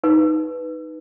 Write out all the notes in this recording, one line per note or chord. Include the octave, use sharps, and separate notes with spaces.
D#4 B4